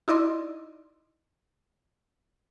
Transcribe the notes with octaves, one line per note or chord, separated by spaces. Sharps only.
D#4 E4 D5 D#5 C6